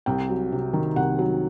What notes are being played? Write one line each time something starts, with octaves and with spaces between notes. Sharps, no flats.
C2 G5
F#3
C3
D#3
C2 F#5
F#3